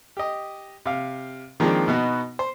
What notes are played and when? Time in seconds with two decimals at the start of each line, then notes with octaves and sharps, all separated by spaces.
0.17 G4 D#5
0.86 C3 F5
1.60 D#3 F3 G#3 A#3 C4 D4
1.88 B2 B3 D#4 F#4
2.39 C5